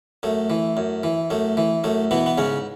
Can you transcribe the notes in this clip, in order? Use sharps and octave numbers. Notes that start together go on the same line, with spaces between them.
F#2 A3
E3
F#2
E3
F#2 A3
E3
F#2 A3
B2 E3 B3
B3
G#2 C#3 C#4